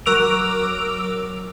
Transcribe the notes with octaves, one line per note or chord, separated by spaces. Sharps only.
F#3 A#4 D6 E6 D7 F7